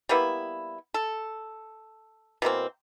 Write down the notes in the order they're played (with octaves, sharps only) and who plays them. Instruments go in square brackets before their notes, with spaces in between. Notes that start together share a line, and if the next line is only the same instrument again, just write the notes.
[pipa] G3 A#3 B3 E4
A4
B2 E3 A#3 C4